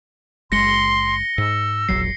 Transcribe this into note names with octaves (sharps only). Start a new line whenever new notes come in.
F#1 G#3 C6 A#6 C#7 G7
G#2 E6
E1 A#1 F#3 C7